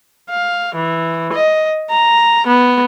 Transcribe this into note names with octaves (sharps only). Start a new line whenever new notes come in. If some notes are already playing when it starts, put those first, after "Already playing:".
F5
E3
D#5
A#5
B3